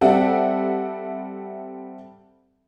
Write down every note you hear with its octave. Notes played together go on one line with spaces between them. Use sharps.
G3 C4 A4 D5 E5 F#5